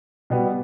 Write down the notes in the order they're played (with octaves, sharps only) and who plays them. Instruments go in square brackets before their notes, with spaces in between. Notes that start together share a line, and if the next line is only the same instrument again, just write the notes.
[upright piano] B2 G3 B3